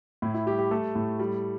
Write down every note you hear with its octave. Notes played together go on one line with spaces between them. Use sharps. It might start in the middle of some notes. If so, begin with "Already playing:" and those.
A2 E4
E4
G3 G4
G4
A3 A4
A2
G3